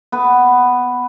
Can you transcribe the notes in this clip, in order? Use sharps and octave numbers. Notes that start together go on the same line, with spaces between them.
B3 B4